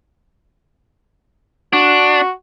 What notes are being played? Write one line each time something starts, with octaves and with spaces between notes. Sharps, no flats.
D4 F#4